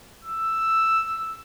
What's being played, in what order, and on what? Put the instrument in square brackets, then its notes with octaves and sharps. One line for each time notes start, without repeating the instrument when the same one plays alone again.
[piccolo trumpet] E6